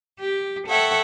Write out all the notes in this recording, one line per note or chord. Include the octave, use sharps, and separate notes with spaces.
G4
A4 C#5 E5 F#5 G5